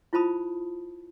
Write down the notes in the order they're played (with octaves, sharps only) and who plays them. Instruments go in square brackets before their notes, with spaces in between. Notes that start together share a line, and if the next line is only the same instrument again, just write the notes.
[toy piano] E4 F4 C5 A5 B5 D#6